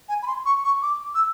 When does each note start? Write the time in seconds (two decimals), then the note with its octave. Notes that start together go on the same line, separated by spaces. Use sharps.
0.09 G#5
0.22 B5
0.27 C6
0.45 C#6
0.64 C#6
0.82 D6
1.15 E6